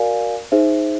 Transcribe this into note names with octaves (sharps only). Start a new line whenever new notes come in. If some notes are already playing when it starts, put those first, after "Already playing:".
Already playing: F#4 A#4 D5 F5 G#5
D#4 G#4 C5 E5